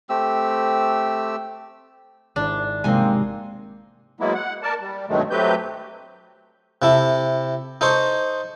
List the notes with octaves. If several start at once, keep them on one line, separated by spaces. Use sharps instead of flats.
A3 C4 G4 E6
G#1 D4 E4 C5
C3 F3 G#3 A#3 C4 D#4 G#5
F#3 G#3 A#3 B3 E4
F#5
A#4 D5 A5
G3
G2 B2 D#3 F#3 G#3 A3
F#3 A3 C4 G4 B4 G6
C3 E4 A4
D#4 A4 C5 C#6